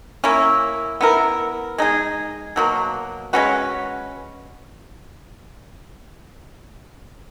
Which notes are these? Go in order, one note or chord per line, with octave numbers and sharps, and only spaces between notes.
A#3 C#4 E4
B3 E4 A#4
G#3 D#4 G#4
B2 F#3 A#3
G#3 C#4 F#4 B4